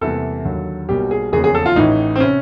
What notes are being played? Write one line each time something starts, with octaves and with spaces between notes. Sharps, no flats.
E2 C3 E3 G3 A#3 A4
D#2 D3 F#3
B1 B2 G3 A#3 G4
G#4
F1 E2 C#3 F3 A#3 G#4
G#4
A4
F4
A1 A2 E3 D#4
C4
C3 C#4